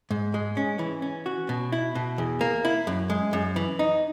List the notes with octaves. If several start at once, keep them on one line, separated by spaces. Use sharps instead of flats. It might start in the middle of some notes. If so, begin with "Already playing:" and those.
G#2
G#3
C#4
E3
C#4
F#4
B2
E4
B2
E2
A#3
E4
F#2
G#3
F#2
E3
D#4